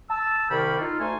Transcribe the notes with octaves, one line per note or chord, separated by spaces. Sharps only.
A5 E6
C2 C3 D#3 A#3 G5 B5
D#4 F4 A4
D2 A3 D#4 G#5 A5 C6